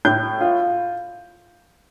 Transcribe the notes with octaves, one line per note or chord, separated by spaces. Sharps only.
A2 G6
F4